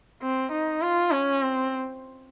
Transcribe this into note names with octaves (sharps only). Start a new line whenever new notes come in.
C4
D#4
F4
C#4
C4